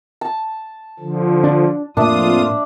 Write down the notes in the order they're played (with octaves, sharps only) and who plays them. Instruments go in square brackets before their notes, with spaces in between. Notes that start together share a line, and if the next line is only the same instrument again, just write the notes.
[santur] A5
[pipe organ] D3 F3
[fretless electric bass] D4
[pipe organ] F2 F4 D#6 [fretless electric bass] A2 A#3 [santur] D4 D5 E5